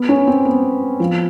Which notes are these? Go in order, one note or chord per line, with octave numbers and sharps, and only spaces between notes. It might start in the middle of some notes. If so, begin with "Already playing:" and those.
Already playing: B3
C#4
C4
B3
F3